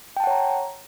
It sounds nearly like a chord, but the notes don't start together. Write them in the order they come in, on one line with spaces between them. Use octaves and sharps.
G5 A5 F#5 C#5 A#5